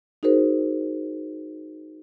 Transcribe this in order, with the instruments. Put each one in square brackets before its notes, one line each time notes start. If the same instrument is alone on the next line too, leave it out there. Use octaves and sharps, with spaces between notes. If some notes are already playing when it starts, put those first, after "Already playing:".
[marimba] D#4 F#4 G#4 A#4 C5